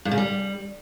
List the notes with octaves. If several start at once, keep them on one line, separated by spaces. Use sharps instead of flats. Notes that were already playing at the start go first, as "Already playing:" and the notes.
G2
C#3
G3